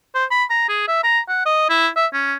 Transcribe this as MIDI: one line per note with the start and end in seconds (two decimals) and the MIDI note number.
0.15 0.25 72
0.31 0.44 83
0.50 0.65 82
0.69 0.87 68
0.88 1.01 76
1.03 1.20 82
1.29 1.42 78
1.46 1.67 75
1.69 1.88 64
1.96 2.07 76
2.13 2.36 61